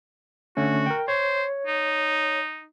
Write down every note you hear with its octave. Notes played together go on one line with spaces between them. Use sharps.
D3 A3 C#4 F#4
A#4 G5
C5 C#5
D#4